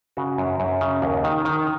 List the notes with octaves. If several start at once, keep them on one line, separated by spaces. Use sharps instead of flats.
C#3 F#4
F#2
F#2
C#3
D#2
D#3
D#3